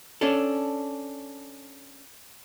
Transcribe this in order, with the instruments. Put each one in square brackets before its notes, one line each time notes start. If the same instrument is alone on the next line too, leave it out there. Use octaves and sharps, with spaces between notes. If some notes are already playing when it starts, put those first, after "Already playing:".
[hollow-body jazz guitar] C#4 D4 A4